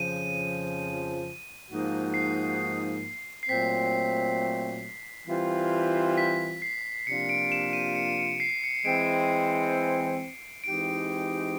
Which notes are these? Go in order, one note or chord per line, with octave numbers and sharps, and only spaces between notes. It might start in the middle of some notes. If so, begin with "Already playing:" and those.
Already playing: F2 C#3 F3 D#7
G#2 F3 A#3 D#4 F#4
C7
C7
A#2 F#3 A3 C4 B6
E3 G3 C4 F4
B6
C7
C3 F3 A#3 D4 F4 C#7
D7
E7
D#7
C#7
C#7
C7
C#7
E3 G#3 C4 D7
E3 G#3 C4 D#4 G4 D7